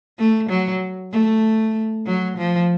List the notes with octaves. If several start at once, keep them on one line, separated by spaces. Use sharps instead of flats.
A3
F#3
A3
F#3
F3